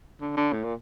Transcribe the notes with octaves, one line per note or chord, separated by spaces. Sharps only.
D3
D3
A2
A#2